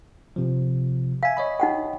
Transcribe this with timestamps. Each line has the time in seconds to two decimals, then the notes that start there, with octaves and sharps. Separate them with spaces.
0.36 C3 F3
1.23 E5 F5 G#5
1.37 C#5 D#5 B5
1.60 D#4 F#5 G5